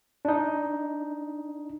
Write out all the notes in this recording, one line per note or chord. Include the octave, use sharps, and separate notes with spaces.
D4 D#4